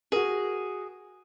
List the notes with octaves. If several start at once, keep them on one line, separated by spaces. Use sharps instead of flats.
F#4 G#4 A#4